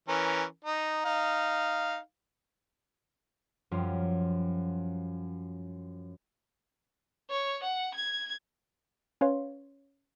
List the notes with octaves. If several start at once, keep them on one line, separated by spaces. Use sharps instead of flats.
E3 C#4 A#4
D#4
D#4 F5
F#2 F3 G3 F4
C#5
F#5
G#6
C#4 B4 C#5 F5 C6